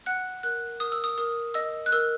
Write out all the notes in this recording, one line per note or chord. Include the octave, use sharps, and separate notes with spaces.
F#5 F#6
A#4 F#6
A#4 D#6
E6
D#6
A#4 D#6
D#5 E6
F#6
A#4 E6